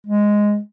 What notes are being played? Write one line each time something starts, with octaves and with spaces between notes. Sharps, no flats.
G#3